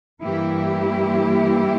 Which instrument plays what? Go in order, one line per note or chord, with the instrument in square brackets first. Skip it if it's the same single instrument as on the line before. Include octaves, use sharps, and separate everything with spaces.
[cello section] G2 E3 A#3 E4 G4